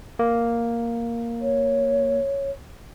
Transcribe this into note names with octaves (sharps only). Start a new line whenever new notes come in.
A#3
C#5